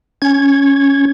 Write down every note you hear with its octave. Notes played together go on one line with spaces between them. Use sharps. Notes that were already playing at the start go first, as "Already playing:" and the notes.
C#4 G#6